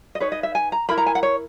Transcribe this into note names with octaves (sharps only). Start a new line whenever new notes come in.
D#5
D#4 G#4 B4 C#5
D#5
E5
G#5
A#5
E4 A#4 B5
A#5
G#5
F#5
C#5